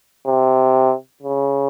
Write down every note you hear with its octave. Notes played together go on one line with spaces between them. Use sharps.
C3
C#3